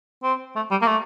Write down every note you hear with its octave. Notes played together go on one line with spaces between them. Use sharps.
C4
A3
G3
A#3
A3